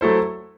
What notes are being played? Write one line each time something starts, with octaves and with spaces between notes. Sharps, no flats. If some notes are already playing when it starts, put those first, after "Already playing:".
F#3 A3 E4 A4 C5